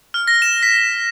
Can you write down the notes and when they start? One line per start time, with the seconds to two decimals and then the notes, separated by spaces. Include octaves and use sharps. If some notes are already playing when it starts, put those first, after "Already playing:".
0.14 F6
0.28 A#6
0.42 E7
0.63 B6